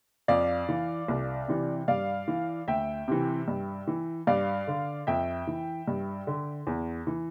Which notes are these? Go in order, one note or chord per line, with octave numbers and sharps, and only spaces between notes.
F2 D5 F5
E3
C2
C3 E3
G2 D5 F5
E3
D2 E5 G5
C3 E3
G2
E3
G2 D5 F5
D3
F2 E5 G5
E3
G2
D3
E2
E3